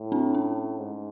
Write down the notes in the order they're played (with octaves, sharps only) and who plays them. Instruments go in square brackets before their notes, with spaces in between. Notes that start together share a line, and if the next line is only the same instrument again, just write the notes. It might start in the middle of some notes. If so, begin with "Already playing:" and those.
Already playing: [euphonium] A2
[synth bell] C4 D4
C#4
[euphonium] G#2